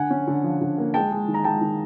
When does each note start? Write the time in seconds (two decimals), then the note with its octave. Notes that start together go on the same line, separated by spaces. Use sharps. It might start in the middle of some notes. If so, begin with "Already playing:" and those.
Already playing: D3 F#5 G#5
0.10 C#4
0.27 D3
0.44 F3
0.61 D3
0.78 A#3
0.94 G#3 G5 A5
1.11 G#3
1.28 D#3
1.34 A#5
1.44 G#3 G5 A5
1.61 D#3